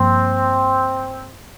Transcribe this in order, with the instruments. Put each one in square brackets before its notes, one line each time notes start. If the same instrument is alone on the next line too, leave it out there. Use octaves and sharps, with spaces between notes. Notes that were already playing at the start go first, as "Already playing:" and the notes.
Already playing: [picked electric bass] G2 F3 A#3 [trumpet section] C4